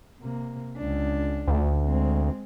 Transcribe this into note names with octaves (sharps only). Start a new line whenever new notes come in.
C3 A#3
C#2 D4
D2
G#3 C4